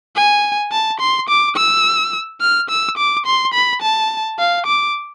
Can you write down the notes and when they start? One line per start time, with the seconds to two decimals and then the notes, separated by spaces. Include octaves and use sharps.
0.16 G#5
0.72 A5
1.00 C6
1.29 D6
1.56 E6
2.41 F6
2.70 E6
2.97 D6
3.26 C6
3.54 B5
3.82 A5
4.39 F5
4.66 D6